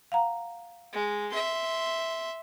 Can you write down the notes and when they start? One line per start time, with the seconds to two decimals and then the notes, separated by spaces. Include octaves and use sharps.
0.12 F5 F#5 A#5
0.93 G#3
1.31 E5 C6